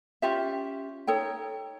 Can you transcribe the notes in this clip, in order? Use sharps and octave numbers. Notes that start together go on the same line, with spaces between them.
C#4 F4 G4 E5
D#4 A4 C#5 G5